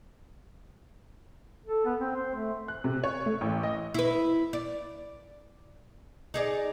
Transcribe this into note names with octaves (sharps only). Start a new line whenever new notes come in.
A4
B3
C4
C5
A3
F#6
C3
C#5
A3
A1
D#5
E4 B4
D5
D#4 G#4 D5